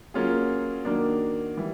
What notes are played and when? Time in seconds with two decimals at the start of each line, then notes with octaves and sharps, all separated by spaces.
0.14 F#3 A#3 C#4 F4 G#4
0.85 D#3 F#3 A#3 D4
1.57 E3 G3